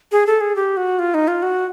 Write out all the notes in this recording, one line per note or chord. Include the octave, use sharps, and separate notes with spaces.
G#4
A4
G#4
G4
F#4
F4
D#4
F4
F#4